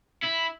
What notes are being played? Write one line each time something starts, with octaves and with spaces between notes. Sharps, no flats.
E4